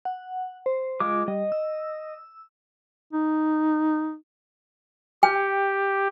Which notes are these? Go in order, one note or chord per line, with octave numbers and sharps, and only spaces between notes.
F#5
C5
G#3 F4 D6
G3 D#5
E6
D#4
G4 G5